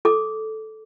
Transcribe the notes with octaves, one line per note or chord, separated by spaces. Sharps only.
A4 D6